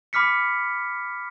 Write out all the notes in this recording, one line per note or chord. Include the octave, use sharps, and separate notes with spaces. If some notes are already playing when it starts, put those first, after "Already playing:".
B5 D6 F6 B6 C#7